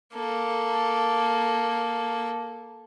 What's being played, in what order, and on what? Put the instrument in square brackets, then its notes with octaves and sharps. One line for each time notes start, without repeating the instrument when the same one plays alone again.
[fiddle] A#3 A4